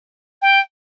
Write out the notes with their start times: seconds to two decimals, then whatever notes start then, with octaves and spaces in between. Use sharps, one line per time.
0.42 G5